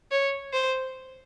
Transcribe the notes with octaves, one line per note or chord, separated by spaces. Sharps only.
C#5
C5